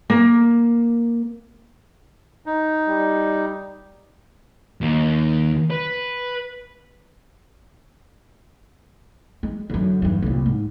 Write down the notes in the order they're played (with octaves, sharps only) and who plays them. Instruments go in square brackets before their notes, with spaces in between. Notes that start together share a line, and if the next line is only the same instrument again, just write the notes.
[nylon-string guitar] A#3
[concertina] D#4
[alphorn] G3
[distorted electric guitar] D#2
B4
[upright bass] G#3
F#2 D3
E2 G2
C2 A#2
G#2